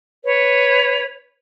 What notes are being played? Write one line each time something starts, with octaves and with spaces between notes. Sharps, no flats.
B4 C#5